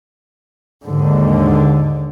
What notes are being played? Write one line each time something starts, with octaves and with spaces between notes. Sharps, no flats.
D#2 G#2 D3